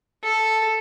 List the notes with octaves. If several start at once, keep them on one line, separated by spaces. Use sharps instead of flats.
A4